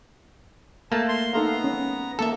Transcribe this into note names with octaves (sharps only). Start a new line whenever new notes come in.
A3 A#3 A5
C6
B3 D#4 A4 F5 A#5
C#4
A#3 A4 E5 A5